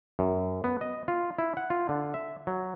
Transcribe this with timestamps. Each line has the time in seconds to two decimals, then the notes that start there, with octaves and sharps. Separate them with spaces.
0.19 F#2
0.64 B3
0.81 D#5
1.08 F4
1.39 E4
1.57 F#5
1.70 F4
1.89 D3
2.14 E5
2.47 F#3